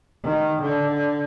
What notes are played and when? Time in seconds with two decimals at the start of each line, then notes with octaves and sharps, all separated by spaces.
0.23 D#3
0.62 D3